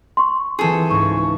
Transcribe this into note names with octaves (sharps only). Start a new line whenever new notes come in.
C6 C#6
E3 C4 F4 G#4 A4
C#2 G#2 C#6